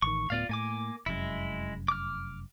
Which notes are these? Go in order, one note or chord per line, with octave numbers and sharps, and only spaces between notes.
A1 D#3 C#6
D1 A2 B3 F4 D5 F5
A2 A#3 G#5 D6
F1 F#2 G#3 E4
D6 F6